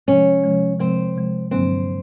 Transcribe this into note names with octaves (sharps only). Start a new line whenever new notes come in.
C3 F3 G#3 C#4
C3 F3 G#3
C3 F3 G#3 C4
C3 F3 G#3
G2 D3 F#3 A#3 C4 D4